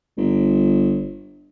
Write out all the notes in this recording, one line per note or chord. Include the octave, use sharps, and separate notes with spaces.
G1